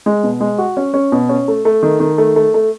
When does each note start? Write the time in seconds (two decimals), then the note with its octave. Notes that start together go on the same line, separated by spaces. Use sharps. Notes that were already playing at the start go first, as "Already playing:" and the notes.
0.06 G#3
0.23 B2
0.40 G#3
0.58 F#4
0.77 C#4
0.94 C#4
1.12 B2
1.29 C#4
1.48 A3
1.65 A3
1.83 D#3
2.00 D#3
2.18 A3
2.36 A3
2.54 A3